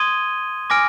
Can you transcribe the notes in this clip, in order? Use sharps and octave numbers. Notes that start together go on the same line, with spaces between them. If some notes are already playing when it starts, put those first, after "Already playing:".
Already playing: C6 D#6 G#6 D#7 G7
G#5 D6 F6 A#6 D7